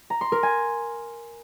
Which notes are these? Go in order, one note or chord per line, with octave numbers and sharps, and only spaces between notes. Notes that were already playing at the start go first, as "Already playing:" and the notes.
A#5
C6
A#4
G#5